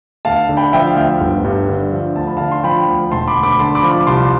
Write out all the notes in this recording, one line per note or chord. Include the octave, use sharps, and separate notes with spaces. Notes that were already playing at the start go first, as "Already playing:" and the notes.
D2 F5 A5
D3
G5 B5
F3 E5 G5
F5
D2 E5 G5
G1
G2
D3
F3
D2 A5
B5
D3 F5 A5
C6
F3 G5 B5
D2
E1 A5 C6
B5 D6
D2
B5 D6
D3 A5 C6
B5 D6
F3
B5 D6
C2 A5 C6